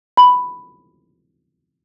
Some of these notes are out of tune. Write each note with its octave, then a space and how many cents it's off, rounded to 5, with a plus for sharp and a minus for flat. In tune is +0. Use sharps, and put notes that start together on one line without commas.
B5 +5